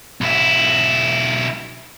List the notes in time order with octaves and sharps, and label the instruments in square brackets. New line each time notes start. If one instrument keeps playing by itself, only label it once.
[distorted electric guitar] B1 E4